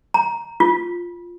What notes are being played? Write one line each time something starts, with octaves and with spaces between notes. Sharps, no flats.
A#5
F4